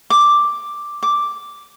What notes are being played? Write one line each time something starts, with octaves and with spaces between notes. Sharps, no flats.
D6
D6